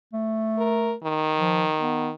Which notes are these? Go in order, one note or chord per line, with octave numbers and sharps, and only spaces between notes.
A3
A#4
D#3
F3
B3